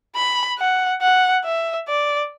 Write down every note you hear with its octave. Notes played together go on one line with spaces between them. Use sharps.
B5
F#5
F#5
E5
D5